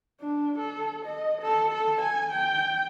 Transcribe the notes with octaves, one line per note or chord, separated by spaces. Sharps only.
D4
A4
D#5
A4
A4
G#5
G5